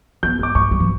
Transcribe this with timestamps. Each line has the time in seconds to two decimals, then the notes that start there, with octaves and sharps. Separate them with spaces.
0.23 B3 G6
0.39 G#3 D6
0.55 A3 C#6
0.71 G3
0.80 E3